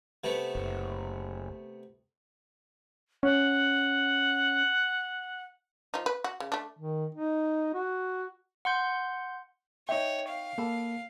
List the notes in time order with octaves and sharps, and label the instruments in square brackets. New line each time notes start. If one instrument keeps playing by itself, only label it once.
[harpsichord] C3 A3 B3
[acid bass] F#1
[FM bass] C#4 [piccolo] F#5
[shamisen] F3 D#4
B4
F#4
C#3
A3 D4
[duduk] D#3
D#4
F#4
[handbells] F#5 C6 G6
[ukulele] D#4 D#5 E5 [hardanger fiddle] C#5 [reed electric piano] G5 C#6
[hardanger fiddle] F5
[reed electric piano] A#3 [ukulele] A4 A5 B5